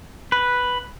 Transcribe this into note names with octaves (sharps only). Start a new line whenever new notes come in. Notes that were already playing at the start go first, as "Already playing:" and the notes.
B4